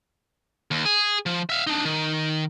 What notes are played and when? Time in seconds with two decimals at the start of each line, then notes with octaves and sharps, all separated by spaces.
0.71 D#2
0.85 G#4
1.26 F3
1.49 E5 F5
1.67 D4 D#4
1.85 D#3